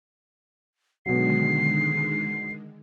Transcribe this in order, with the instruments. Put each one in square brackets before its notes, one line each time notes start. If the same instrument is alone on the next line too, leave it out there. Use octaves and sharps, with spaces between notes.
[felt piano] B2 F#3 [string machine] D3 D#3 G#3 [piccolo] C7